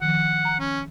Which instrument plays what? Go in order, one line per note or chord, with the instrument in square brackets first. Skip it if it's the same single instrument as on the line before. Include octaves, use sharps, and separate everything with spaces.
[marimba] D#3 F3 [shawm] F#5
[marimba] A#5
[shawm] C#4